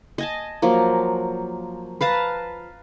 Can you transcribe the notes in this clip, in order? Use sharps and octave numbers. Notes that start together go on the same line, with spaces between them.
D#5 G#5 A5
F3 F#3 A#3
B4 F5 A5 A#5